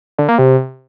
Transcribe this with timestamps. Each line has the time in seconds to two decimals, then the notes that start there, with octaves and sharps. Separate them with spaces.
0.18 D3
0.28 A#3
0.38 C3